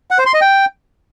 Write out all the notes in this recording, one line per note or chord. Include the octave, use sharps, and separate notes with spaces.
F#5
C5
C6
D#5
G5